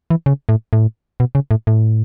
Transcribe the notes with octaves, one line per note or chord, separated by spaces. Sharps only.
E3
C#3
A2
A2
B2
C#3
A2
A2